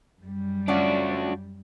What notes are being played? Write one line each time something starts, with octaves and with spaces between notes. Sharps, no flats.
F#2 G3
C#4 D4 F4 F#4 D5